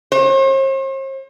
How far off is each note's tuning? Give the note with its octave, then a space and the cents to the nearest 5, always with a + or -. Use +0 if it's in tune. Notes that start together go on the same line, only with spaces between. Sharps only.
C5 +45